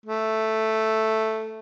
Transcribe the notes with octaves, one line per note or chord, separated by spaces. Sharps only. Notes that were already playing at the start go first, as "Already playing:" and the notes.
A3